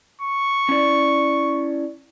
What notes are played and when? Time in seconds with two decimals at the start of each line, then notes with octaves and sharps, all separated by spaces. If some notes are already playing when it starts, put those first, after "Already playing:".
0.21 C#6
0.69 C#4 E4 D5